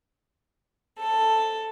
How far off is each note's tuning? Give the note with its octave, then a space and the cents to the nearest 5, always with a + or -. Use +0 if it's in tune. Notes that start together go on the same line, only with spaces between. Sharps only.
A4 +5